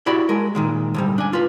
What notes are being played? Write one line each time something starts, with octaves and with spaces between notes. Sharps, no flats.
E4 F#4 G4 D5 B5
G#3 A#4
A#2 D#3 G#3
D2 G#2 G3
D4 G#5
F4 B4